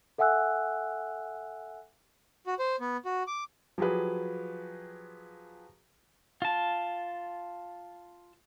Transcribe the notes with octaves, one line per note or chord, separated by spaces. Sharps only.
A4 E5 F#5 G#5 E6 F#6
F#4
C5
B3
F#4
D6
F3 F#3 G4 G#4 B4
F4 A5